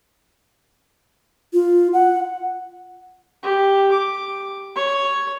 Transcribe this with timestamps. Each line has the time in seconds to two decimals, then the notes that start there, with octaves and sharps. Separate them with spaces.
1.53 F4
1.93 F#5
3.43 G4
3.92 D6
4.76 C#5